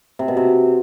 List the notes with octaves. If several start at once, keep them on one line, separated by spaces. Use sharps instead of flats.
C3
B2
C3